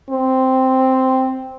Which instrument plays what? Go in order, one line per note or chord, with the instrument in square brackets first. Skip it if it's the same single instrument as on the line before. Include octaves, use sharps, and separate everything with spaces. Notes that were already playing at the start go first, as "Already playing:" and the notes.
[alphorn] C4